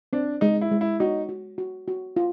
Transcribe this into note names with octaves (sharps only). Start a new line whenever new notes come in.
C4 D4
G#3 D#4
E4
G#3
E4
D#4 F#4
F#4
F#4
F#4
F4